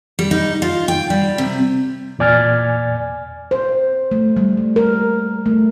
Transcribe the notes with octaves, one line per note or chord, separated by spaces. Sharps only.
G3
D#4
F4
G5
G3
C3
E2 A#2 D5 G#5 F6 A6
C5
A3
G3
A3
A#4
A3